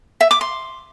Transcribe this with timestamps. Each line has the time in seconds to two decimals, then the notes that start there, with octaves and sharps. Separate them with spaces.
0.21 E5
0.31 D6
0.41 C6